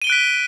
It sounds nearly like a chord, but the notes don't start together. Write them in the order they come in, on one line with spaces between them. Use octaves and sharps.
D#7 G7 D7 F#6 B6